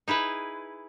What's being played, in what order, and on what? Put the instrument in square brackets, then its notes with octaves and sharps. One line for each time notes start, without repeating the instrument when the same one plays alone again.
[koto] D#4 E4 G#4 B4